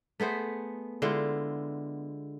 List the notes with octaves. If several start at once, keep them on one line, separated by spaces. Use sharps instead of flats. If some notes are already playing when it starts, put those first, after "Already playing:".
A3 B3 G#4 C5
D3 G#3 E4 F4